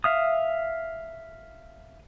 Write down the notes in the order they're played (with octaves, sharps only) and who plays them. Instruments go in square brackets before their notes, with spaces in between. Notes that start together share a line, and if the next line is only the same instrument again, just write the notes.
[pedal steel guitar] E5 F5 D#6